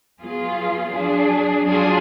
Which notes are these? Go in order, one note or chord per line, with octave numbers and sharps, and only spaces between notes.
F#3 B3 F4 G#4
F#3 D4 G#4
F#3 D4 F4 G#4